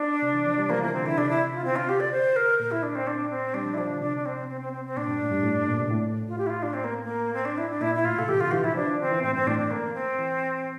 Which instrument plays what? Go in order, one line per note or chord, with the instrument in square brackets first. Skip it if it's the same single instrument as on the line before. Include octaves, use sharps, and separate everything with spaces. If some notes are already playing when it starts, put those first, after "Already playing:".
Already playing: [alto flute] D4
[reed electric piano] C3
E3
F3
G3
[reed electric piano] F3 [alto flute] A#3
[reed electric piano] E3 [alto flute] A#3
[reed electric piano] D3 [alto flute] C4
[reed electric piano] D3 [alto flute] E4
[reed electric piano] C3 [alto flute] D4
[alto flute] E4
F4
[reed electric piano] D3 [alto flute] C4
[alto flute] F4
G4
D5
C5
A#4
[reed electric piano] A#2 [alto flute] A#4
[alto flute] E4
D4
C4
D4
C4
[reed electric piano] G3 [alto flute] D4
[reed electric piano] F3
[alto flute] E4
[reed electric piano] F3 [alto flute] D4
[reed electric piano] D3
[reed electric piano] C3 [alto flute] D4
[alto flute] D4
C4
C4
C4
C4
C4
[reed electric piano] A#2 [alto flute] D4
[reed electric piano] G2
A2
G2
A2
A#2
C3
A2
[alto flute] F4
G4
E4
F4
D4
C4
A#3
A#3
C4
D4
E4
D4
[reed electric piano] A#2 [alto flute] E4
[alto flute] E4
[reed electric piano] A2 [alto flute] F4
[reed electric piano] C3 [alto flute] A4
[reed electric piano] E3 [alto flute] G4
[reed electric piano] D3 [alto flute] F4
[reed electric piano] E3 [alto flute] G4
[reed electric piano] F3 [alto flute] E4
[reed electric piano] F3 [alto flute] D4
[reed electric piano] E3
[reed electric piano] D3 [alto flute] C4
[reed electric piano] E3
[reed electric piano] A2 [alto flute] C4
[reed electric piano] G2 [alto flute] C4
[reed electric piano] A2 [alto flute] D4
[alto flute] D4
A#3
C4
[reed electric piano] E3